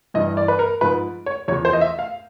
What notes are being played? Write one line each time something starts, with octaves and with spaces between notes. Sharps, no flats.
G2 E3 D#5
D5
B4
A#4
G#2 F3 B4
C#5
E2 C#3 F3 C#5
C5
D#5
E5
F5